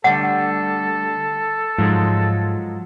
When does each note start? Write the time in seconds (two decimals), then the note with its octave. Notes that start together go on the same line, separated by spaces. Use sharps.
0.04 D3 G3 A3 A4 F#5
1.79 G#2 F3 F#3 G#3